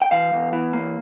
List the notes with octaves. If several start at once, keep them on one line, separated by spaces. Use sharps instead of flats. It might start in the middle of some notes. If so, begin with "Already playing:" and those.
G5
E3 F5
E2
E3
A#3